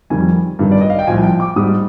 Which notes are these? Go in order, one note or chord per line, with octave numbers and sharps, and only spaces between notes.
F2 D#3 G3 G#5
G2 D#3 G3
D5
D#5
F5
G5
C2 A#2 F3 G#5
G5
D6
G#2 G3 D#6